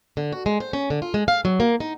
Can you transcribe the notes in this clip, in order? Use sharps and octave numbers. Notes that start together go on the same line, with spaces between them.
D3
F#4
G#3
C5
C#4
D3
F4
G#3
F5
F#3
A#3
D#4